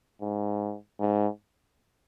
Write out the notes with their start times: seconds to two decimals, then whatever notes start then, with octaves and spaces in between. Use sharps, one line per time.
0.21 G#2
1.00 G#2